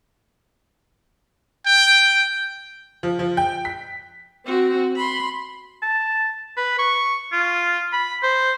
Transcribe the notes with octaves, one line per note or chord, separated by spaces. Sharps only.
G5
F3
F3
G5
B6
C4 F#4
B5 C6
A5
B4
C#6
F4
B5
C5